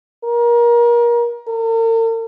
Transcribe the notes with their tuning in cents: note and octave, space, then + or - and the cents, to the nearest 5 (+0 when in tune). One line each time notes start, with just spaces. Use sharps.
A#4 +30
A#4 -45